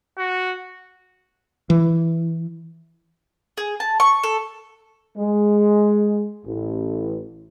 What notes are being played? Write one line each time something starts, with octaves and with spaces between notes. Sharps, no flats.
F#4
E3
G#4
A5
C#6
A4
G#3
A1